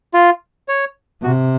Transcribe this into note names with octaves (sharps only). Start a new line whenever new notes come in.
F4
C#5
C3 F#4